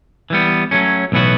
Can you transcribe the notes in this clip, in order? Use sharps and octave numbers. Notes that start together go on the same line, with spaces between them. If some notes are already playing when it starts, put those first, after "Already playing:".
E3 G3 B3
F#3 A3 C#4
B1 A2 E3 B3 F#4